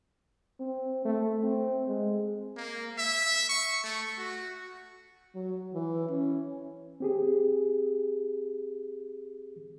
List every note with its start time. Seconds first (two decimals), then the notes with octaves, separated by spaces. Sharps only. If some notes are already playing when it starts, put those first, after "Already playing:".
0.60 C4
1.05 A3
1.44 C4
1.88 G#3
2.57 A#3
2.98 E5
3.49 C#6
3.84 A3
4.18 F#4
5.35 F#3
5.74 E3
6.09 C#4
7.00 C4 G4 G#4